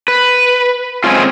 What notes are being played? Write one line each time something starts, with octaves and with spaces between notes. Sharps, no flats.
B4
G#3 C4 C#4 F4